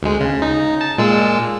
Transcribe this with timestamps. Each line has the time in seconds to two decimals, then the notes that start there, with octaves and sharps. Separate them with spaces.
0.03 D2 G#3
0.20 C#3
0.42 D#4
0.81 A5
0.98 A#2 G#3 E6